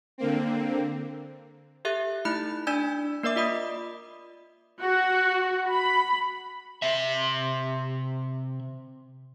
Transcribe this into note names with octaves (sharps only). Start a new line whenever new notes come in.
D3 A#3 C4
G4 A4 E5 F#6
A3 D#4 E4 B5 F#6
D4 D5 G#5 E6 G6
A#3 A#4 D5 E5 D6
F4 D5 D#5 B5 D#6
F#4
B5
C3 E5